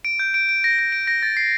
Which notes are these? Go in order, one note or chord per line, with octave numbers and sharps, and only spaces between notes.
D7
G6
D7
D7
A#6
A#6
D7
A#6
A6
C7